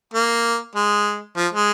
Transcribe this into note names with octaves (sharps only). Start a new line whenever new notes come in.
A#3
G#3
F3
G#3